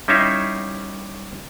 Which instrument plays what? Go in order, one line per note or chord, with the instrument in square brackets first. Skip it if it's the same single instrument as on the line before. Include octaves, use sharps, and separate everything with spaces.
[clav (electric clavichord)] G3 C#4 D#4 E4 E5 F5